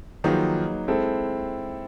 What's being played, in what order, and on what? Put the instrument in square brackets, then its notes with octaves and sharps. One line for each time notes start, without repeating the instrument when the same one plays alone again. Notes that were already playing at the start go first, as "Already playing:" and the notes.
[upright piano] D#3 F3 [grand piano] F#3 A#3 D#4 G#4 B4
[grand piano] G#3 C4 E4 A4